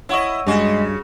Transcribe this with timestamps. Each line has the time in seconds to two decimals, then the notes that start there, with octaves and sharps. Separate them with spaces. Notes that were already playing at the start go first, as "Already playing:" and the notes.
0.09 E4 C#5 D#5 F#5 C#6
0.47 G2 C#3 G#3 F#4 G4 G#5